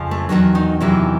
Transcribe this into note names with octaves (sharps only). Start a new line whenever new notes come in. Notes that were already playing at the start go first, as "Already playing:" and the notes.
Already playing: F2 C#3 F3
A3
E2 C3 D#3 F#3
D#3 D#4
E2 C3 D#3 E3 F#3 E4